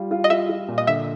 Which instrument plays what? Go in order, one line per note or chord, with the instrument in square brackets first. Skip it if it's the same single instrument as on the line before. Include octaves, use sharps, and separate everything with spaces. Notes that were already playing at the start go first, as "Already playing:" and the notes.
Already playing: [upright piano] G3 F4
F4
[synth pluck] D#5
[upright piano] F4 [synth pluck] E5
[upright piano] F4
A#2
[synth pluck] D#5
[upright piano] D3 [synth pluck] E5